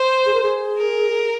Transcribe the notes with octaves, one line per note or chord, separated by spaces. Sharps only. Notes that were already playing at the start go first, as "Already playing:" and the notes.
Already playing: C5
G#4
A#4
G#4
A#4